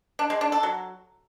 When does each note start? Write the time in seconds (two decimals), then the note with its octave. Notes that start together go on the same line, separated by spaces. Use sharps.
0.19 D4
0.30 G#3
0.41 D4
0.52 A4
0.63 F#3